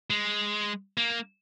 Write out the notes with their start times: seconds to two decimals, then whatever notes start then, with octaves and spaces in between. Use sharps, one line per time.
0.10 G#3
0.98 A#3